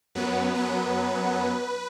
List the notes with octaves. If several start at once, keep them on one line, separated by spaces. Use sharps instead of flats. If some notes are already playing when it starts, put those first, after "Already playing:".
F#2 F#3 B3 B4
B4